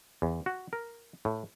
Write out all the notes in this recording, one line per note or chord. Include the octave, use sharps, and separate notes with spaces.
E2
F#4
A#4
A2